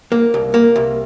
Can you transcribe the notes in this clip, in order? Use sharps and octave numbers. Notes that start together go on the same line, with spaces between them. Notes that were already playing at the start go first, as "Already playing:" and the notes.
A#3
C2
A#3
C2